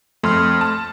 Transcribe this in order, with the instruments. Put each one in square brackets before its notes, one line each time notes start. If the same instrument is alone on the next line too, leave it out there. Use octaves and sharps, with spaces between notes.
[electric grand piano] F2 [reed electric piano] A3 C6 F6
[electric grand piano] A5